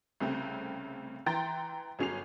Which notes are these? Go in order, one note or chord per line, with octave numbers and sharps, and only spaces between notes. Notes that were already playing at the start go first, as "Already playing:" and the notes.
C2 C#3 A3 C4
E3 G5 A#5 C6 A6
G1 F#3 C#4 G#4 C7 F7